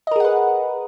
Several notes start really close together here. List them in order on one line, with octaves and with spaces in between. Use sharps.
D#5 A#4 G#4 F#5 B4